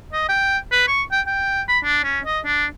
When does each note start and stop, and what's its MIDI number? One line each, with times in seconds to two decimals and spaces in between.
0.13 0.24 75
0.29 0.58 79
0.72 0.85 71
0.88 1.02 85
1.12 1.21 79
1.27 1.62 79
1.68 1.79 83
1.84 2.00 62
2.04 2.20 61
2.25 2.40 75
2.45 2.66 62